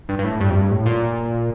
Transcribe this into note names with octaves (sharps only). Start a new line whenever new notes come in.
G2
G2
A2
G2
F2
G2
A2
A#2